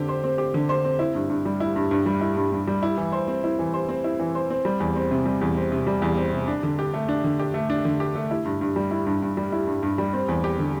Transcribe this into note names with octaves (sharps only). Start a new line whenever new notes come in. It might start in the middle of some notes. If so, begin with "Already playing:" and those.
Already playing: D3 C4 G4
C5
C4
G4
D3
C5
C4
E4
G2
G2
G3
E4
G2
G2
G3
E4
G2
G2
G3
E4
E3
C5
C4
E4
E3
C5
C4
E4
E3
C5
C4
G3
E2
C4
C3
G3
E2
C4
C3
G3
E2
C4
C3
D4
D3
G4
A3
D4
D3
G4
A3
D4
D3
G4
A3
E4
G2
G2
G3
E4
G2
G2
G3
E4
G2
G2
G3
C4
E2
G4
D3